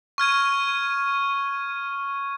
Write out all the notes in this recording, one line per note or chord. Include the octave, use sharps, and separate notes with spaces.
C#6 F6 G#6 D#7